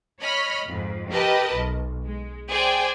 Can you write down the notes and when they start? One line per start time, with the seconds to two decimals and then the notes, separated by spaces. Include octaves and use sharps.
0.21 C#5 D#5 B5 F6
0.66 F2 G#2
1.10 G4 A#4 B4 D#5 A5
1.54 B1
2.03 G#3
2.50 G#4 C5 D5 G5 G#5